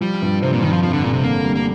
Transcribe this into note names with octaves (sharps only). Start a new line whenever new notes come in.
F3 G3
G2
C3 C4
A#2
G2 D#3
F3
F2 F3
D3
F1 A#2
C3
D3 A#3
G3
A#3